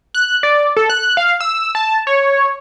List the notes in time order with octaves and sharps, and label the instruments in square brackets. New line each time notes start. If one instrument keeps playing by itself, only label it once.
[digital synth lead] F#6
D5
A4
F#6
F5
E6
A5
C#5